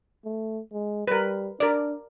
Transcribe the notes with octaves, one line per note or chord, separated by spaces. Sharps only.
A3
G#3
G3 A#4 B4
D4 A#4 D5